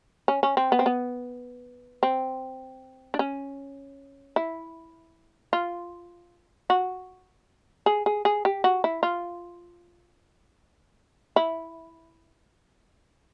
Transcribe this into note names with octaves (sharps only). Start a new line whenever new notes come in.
C#4
C#4
C4
B3
C4
B3
C4
D4
C#4
E4
F4
F#4
G#4
G#4
G#4
G4
F#4
E4
F4
E4